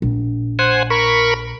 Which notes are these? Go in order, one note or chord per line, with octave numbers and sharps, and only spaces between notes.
A#1
C5 F#5 G#5
A#4 B5 C#6